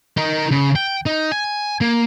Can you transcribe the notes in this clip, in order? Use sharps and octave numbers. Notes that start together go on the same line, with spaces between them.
D#4 A#4
C#3
G5
D#4
G#5
A#3